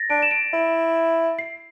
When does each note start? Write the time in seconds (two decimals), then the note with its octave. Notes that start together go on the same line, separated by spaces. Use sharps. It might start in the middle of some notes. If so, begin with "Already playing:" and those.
Already playing: A6 A#6
0.10 D4 D7
0.22 E7
0.31 D7
0.53 E4
1.39 C7